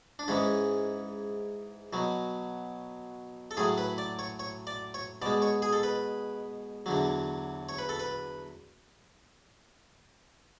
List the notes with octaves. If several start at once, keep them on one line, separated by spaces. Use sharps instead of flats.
D4
G#2 E3 G#3 C#4
B2 F#3
A4
A2 F#3 G#4
B4
D5
C#5
C#5
D5
C#5
B2 G#3 D5
C#5
G#4
A4
B4
E2 D3 F#3
C#5
B4
A4
B4